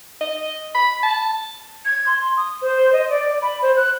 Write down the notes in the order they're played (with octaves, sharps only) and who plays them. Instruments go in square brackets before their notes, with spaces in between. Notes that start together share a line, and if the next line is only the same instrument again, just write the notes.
[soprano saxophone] D#5
B5
A5
[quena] G#6
C6
D#6
C5
D#5
D5
B5
C5
F#6